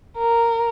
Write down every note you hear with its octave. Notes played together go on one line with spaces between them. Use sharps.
A#4